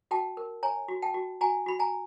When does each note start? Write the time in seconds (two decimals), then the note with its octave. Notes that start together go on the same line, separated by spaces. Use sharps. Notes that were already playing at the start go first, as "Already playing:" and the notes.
0.11 F#4 G5 A5
0.37 A#4
0.63 C#5 G#5 A#5
0.88 F#4
1.02 G5 A5
1.14 F#4
1.41 F#4 G#5 A#5
1.66 F#4 B5
1.79 G#5 A#5